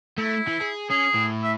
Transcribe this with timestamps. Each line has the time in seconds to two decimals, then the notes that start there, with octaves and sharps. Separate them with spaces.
0.18 A3 E4
0.47 E3
0.61 G#4
0.90 C#4 G#4
1.14 A2
1.43 E5